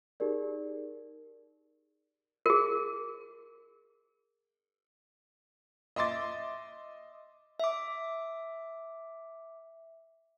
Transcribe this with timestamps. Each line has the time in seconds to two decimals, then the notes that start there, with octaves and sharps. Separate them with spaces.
0.20 D#4 G4 G#4 A#4 D5
2.46 G#4 A#4
5.96 D#5 E5 C6 D6 A6
7.60 E5 D6